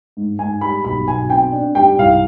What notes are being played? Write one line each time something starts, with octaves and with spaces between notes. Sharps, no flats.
G#2
G#2 G#5
G3 B5
B1 B5
B2 G#5
C4 G5
D4
G3 G5
C2 F5